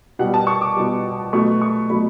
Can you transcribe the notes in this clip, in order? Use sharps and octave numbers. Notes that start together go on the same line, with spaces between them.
B2 G3 F#5
A5
C#6
D6
B2 G3
B2 F#3 A3 C#6
C#6
B2 F#3 A3 B5